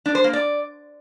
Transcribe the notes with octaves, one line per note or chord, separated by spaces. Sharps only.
D4
C5
A#3
D5